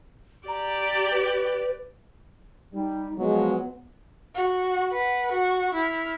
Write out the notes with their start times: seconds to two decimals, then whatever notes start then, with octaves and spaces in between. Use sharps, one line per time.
0.48 G4 D5 A#5
1.11 B4
2.74 G3 D#4
3.18 F3 F#3 G#3 B3
4.35 F#4
4.92 B4 F#5
5.32 F#4
5.75 E4 F6